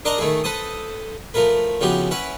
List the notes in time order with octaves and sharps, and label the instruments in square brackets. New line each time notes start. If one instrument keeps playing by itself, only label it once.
[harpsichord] D4 A#4 D5 D#5 A#5 C6
D#3 A3 E4 G#4
A4 B4 C5 A5 D#6
F3 A3 A#4 B4
C#3 E3 F3 B3 F#4 G4
C#4 E4 B4 F#5